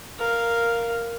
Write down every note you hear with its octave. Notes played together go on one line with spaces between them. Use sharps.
A#4 F5